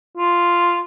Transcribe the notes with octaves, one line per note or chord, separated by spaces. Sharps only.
F4